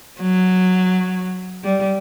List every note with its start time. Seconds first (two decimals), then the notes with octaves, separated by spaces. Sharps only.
0.20 F#3
1.64 G3